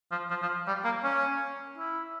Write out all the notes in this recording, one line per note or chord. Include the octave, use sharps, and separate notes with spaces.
F3
F3
F3
G3
A#3
C#4
E4